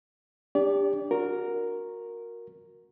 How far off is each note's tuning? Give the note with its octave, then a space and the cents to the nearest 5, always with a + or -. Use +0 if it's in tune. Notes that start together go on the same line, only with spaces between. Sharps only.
D4 +0 G4 +25 D5 -35
F#4 -25 A#4 +0